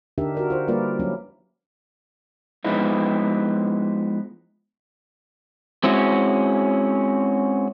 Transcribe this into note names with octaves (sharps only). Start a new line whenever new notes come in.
D3 D4 D#4 G4 A#4 E5
F#4 A#4 D5
F4 C5
G3 A#3 F4 A#4 B4 D5
F#3 C#4 E4
F3 G#3 B3 D#4 E4
G#3 C4 C#4 E4 F#4